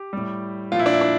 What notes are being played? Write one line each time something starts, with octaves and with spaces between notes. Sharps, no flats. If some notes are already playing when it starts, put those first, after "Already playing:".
Already playing: G4
A2 G3
A#2 F3 F4
E4
D4
E4
D4